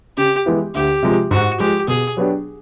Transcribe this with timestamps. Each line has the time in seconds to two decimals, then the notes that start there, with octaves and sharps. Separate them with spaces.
0.17 C#3 G4
0.46 E3 G#3 B3 E4
0.75 D2 G4
1.02 C3 F3 G#3
1.31 G#2 F#4
1.59 F3 G#3 G4
1.88 B2 G#4
2.17 F#3 B3 D4 G4